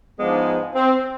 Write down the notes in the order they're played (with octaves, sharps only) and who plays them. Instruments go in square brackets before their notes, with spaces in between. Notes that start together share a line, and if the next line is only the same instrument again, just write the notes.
[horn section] G#2 F3 G#3 B3 D4
C4